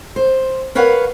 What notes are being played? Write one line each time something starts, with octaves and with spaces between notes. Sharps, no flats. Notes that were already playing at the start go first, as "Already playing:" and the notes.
C5
A#4 B4 C#5 F5 F#5